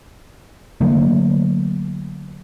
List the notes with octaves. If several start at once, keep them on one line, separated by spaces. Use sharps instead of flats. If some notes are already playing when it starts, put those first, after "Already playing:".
D3 F#3 A3 A#3